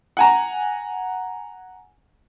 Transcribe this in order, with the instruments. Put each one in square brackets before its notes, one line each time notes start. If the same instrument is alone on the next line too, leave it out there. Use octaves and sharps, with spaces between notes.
[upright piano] F#5 G#5 A#5